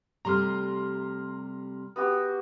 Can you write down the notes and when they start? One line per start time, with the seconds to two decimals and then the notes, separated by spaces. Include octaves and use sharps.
0.25 C3 G3 A3 A#5 C6 F6
1.96 B3 F#4 G4